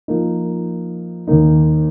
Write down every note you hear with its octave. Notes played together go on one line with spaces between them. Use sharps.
F3 A#3 D#4
D#2 D#3 A#3 D#4